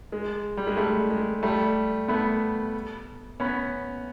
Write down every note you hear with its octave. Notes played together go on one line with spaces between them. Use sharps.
G#3
G3
G#3
G3 A3
G#3
G3 A3
A3 B3
B3 C#4